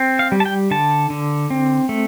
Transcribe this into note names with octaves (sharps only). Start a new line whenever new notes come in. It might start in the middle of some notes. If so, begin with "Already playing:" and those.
Already playing: C4
F5
G3
A5
G5
D3 A5
D3
C4
A3